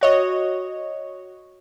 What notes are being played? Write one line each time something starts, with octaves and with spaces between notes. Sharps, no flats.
F#4 C#5 D#5